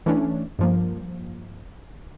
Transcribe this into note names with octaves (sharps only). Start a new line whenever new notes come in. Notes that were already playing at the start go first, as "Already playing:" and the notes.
E3 A3 C#4 D4
G2 F3 A#3